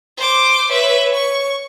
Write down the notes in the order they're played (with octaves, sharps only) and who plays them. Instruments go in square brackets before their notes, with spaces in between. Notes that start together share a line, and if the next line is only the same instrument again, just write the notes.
[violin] C5 D6
[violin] B4 E5 [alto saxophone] C#5
[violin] C#6